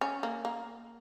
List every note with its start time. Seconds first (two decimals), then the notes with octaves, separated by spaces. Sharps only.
0.01 C#4
0.23 A#3
0.45 A#3